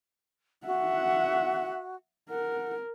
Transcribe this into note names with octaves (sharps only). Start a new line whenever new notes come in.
F#4 E5 F#5
A#4 F#5